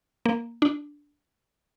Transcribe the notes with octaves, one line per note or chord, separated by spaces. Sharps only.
A#3
D4